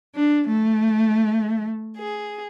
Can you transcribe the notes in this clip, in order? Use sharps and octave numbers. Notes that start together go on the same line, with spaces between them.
D4
A3
G#4